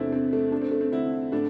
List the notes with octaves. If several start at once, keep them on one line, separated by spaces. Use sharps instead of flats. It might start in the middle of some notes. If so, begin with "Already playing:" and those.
Already playing: E2 C3 A3 C4 D4 E4
A3 C4
A3
A3 D4
C4
A3
C4
D3 C4 E4
A2 A3 D4